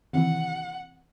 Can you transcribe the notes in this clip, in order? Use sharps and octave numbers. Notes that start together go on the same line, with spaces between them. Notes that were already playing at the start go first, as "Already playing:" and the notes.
D#2 C3 E3 F#5